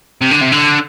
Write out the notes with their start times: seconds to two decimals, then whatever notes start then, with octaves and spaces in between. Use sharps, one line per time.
0.21 C3
0.31 D3
0.41 C3
0.52 D3